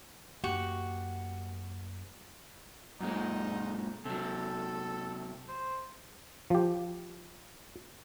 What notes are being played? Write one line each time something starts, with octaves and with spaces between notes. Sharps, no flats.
F#2 A#3 F#4 G4
F#2 A#2 G#3 D#4
C3 F#3 A4
C5
F3 G4